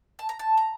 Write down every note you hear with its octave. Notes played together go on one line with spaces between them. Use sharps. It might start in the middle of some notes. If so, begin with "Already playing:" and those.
A5
A#5
A5
A#5